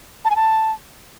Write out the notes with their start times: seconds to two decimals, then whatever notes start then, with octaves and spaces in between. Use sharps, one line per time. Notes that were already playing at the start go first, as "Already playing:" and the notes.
0.25 A5
0.30 G#5
0.36 A5